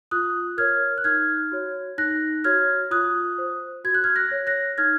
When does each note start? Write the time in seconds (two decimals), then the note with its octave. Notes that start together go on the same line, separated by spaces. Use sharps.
0.11 F4 D#6 F#6
0.57 A#4 C#5 F6 G#6
0.98 F#6
1.04 D#4 F6 G#6
1.51 F#4 C#5
1.98 D#4 F#6 A#6
2.44 F#4 C#5 F6 G#6
2.91 F4 D#6 F#6
3.38 C5
3.84 F#4 G#6
3.94 F#6
4.04 F6 G#6
4.16 F#6 A#6
4.31 C#5
4.47 F#6 A#6
4.78 D#4 F6 G#6